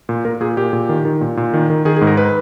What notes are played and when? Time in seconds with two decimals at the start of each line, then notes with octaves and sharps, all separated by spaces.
0.09 A#2
0.25 A#2 A#4
0.41 A#2 G#4
0.57 A#2 G4
0.73 A#2
0.89 D#3
1.05 D#3
1.21 A#2
1.37 A#2
1.54 D#3
1.70 D#3
1.85 D#3 G#4
1.96 G#4
2.01 G#2
2.07 A#4
2.17 B4